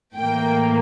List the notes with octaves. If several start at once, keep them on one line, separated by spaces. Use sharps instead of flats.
A2 E3 A#3 G5